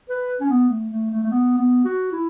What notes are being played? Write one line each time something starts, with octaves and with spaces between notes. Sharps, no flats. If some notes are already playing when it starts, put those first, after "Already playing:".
B4
C#4
B3
A3
A3
A3
A3
B3
B3
F#4
E4